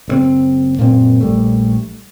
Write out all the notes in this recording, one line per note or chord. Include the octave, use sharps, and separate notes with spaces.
F#1 C#3 C4
F#2 A#2 A#3 C4
A#1 G3 A3